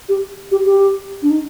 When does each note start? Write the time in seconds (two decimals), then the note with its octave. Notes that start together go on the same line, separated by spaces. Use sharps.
0.09 G4
0.51 G4
0.65 G4
1.23 D4
1.30 D#4